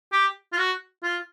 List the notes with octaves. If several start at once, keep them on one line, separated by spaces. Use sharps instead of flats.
G4
F4
F#4
F4